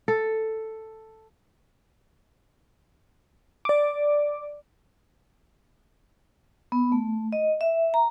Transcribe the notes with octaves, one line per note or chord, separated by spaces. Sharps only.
A4
D5 D6
B3
A3
D#5
E5
A#5